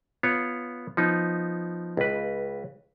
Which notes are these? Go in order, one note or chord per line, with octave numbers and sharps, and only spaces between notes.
B3 F4 C#5
F3 B3 D#4
C#2 B4